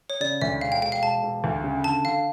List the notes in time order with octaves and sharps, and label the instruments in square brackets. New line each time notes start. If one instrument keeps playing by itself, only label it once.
[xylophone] C#5
[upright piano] C#3 [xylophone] D5
[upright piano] D2 [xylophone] E5
[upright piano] E1 [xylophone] F5
[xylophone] G5
[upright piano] E1 [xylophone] G5
[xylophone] F5
[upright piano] E1 [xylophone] A5
[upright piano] E1
D2
C#3
[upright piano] D3 [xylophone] A5
[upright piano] D3 [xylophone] F5